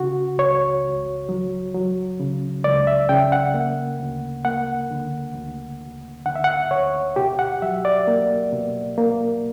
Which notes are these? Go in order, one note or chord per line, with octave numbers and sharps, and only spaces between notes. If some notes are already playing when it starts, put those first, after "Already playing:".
Already playing: C#3 F#4
C#2 C#5
C#2
F#3
F#3
C#3
C#2 D5
E5
C#3 G5
F#5
A#3
D2
A#3 F#5
D3
D2
D2
D3 F#5
E5
F#5
D2 C#5
B2 G4
F#5
F#3 E5
D5
A#3
B2
A#3